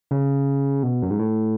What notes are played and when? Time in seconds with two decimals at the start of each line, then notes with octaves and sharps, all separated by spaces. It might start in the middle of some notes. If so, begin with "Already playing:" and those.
0.11 C#3
0.83 B2
1.02 F#2
1.11 G#2
1.19 A2